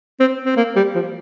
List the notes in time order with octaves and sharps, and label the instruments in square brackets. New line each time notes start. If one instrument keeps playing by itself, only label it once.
[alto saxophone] C4
C4
A#3
G3
F3